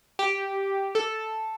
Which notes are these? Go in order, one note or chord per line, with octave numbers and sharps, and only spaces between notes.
G4
A4